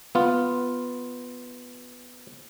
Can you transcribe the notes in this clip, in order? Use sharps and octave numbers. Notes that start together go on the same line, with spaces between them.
B3 F4